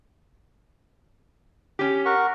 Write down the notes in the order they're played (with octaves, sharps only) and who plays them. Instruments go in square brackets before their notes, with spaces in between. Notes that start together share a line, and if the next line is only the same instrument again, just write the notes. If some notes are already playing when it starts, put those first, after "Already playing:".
[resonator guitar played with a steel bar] C#4 G4
[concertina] A#4 F#5 C#6